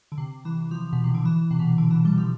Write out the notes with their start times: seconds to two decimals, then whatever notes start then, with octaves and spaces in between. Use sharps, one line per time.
0.12 D3
0.18 C3
0.45 E3
0.71 F3
0.93 B2
1.04 C3
1.15 D3
1.25 E3
1.51 C3
1.59 B2
1.67 C3
1.78 D3
1.91 E3
2.05 G3
2.18 F3